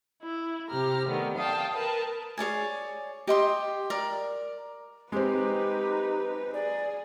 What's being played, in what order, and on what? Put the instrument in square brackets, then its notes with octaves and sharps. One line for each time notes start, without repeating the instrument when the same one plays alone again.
[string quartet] E4
C3 G4 A#5 F6
D#3 G3 A3 B3
F5 G5 A5 D#6
A#4 B4 A5
[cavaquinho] G#4 C#5 D5 G#5
G4 D#5 C6 D#6
A#4 D5
[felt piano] G#3 C4 [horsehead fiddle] D#4 B4 [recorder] G4
[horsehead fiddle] G#4 [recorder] D5